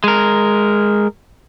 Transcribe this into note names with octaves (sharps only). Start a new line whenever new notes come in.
G#3 A#4